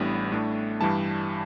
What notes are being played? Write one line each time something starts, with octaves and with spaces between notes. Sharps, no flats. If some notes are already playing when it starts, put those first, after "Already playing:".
Already playing: A1 A2 G3 B3 D4 B5
A2 A3 D4
G2 E3 G3 A5